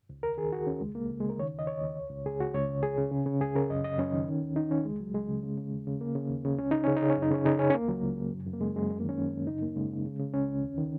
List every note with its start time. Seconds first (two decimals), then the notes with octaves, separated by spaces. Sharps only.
0.09 C#2
0.23 D#2 A#4
0.37 D#3 G#4
0.52 D#2 F#4
0.67 D#2 C#4
0.81 C#2 G#3
0.95 C#2 A#3
1.10 C#3
1.20 G#3
1.24 C#3
1.29 A#4
1.38 D#3 C#5
1.53 D#2
1.59 D#5
1.67 D#2 C#5
1.82 D#2
1.97 C#2
2.10 C#2
2.26 C#2 G#4
2.40 C#2 F#4
2.54 C#2 C#5
2.69 C#3
2.83 C#2 G#4
2.97 C#3
3.12 C#3
3.26 C#3
3.41 C#2 G#4
3.55 C#3 A#4
3.70 F#2 D#5
3.84 F#2 D#5
3.99 F#2 C#4
4.13 D#3
4.28 D#3
4.42 D#2
4.56 D#3 D#4
4.70 D#3 C#4
4.85 C#2 G#3
4.99 C#2 F#3
5.14 C#2 G#3
5.29 C#3
5.43 C#3
5.57 C#3
5.72 D#2
5.87 C#3
6.01 C#3 A#3
6.15 C#3
6.30 D#2
6.45 C#3
6.59 C#2 C#4
6.71 C#3 D#4
6.84 C#3 C#4
6.97 D#4
7.02 C#3
7.10 C#4
7.17 F#2
7.22 D#4
7.31 C#3 C#4
7.45 C#3 D#4
7.59 C#3 C#4
7.70 C#4
7.74 C#2 A#3
7.88 C#2 F#3
8.03 C#2
8.18 C#3
8.33 F#2
8.46 F#2
8.53 A#3
8.60 C#3 G#3
8.76 F#2 G#3
8.90 F#2 G#3
9.00 A#3
9.04 D#3 C#4
9.19 F#2
9.32 F#2
9.47 C#3 D#4
9.62 D#2 A#3
9.76 C#3 G#3
9.91 C#3
10.05 C#3
10.19 C#3
10.34 C#2 C#4
10.48 C#2
10.62 D#2
10.78 D#3